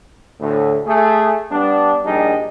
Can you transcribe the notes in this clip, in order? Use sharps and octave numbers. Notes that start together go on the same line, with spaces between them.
D2 A2
A3 G#4
G3 B3 D4
A#1 G3 D4 D#4 G#4